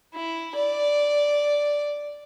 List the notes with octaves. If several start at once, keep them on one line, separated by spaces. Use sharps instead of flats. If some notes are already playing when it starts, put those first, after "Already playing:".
E4
D5